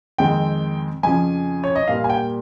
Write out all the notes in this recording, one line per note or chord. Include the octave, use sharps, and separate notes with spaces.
F2 D#3 G#3 C4 G5
F2 C#3 F3 G#5
C#5
D#5
A#2 G3 A#3 F5
G#5
G5